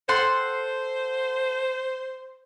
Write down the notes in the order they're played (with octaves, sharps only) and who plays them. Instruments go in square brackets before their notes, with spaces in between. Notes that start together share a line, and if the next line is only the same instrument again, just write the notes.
[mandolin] A4 F#5 C6 [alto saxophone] C5